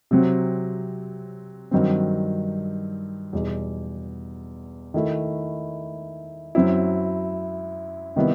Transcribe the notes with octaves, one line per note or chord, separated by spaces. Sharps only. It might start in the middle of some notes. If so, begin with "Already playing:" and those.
C3 F#3 C4
G2 D#3 F#3 C4
E2 B2 G3 D#4
D#3 A3 E4
F#2 F#3 C4 E4
C3 D#3 G3 B3 E4